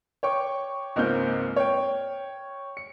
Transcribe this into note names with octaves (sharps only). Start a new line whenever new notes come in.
C#5 G5 C#6 D6
C#2 G#2 A#3 C4 F6 G6
C#5 G5
C#7